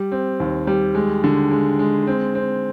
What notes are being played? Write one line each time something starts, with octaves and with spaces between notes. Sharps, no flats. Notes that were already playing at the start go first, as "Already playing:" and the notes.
Already playing: G3
C4
D#2
G3
G#3
D3
G#3
G#3
C4
C4